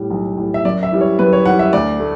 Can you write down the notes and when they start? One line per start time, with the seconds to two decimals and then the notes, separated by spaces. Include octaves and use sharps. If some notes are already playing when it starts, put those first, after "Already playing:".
Already playing: A2 G3
0.11 B1
0.37 A2 G3
0.54 E5
0.65 F#2 D5
0.83 E5
0.92 E3 G3
1.01 C#5
1.19 F#2 B4
1.33 C#5
1.46 E3 G3 F#5
1.59 E5
1.73 D2 D5
2.00 A3